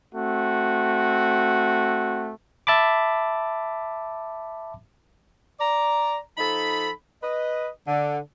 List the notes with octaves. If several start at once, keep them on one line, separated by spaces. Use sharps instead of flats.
A3 C4 F#4
E5 A5 B5 D6
D5 A#5
F3 D#4 A4 B5
B4 D#5
D3